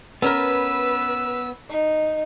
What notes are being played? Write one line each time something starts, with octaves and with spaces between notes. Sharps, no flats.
B3 C#4 A#4 B4 E6
D#4